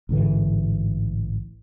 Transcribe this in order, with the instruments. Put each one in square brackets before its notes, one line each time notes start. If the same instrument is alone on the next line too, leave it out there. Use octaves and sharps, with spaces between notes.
[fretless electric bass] A1 G#2 D3 E3